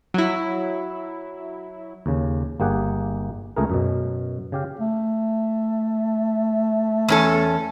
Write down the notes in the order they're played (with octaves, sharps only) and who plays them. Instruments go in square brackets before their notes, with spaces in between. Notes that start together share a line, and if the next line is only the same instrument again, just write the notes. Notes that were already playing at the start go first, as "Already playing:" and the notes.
[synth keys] F#3 E4
[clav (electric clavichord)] D#2 C#3
G1 A#3 G4 G#4 F#5
C#2 A3 G#4 A#4
F#2 B2
C#3 G4 F5
[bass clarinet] A3
[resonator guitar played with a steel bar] E2 C#4 A4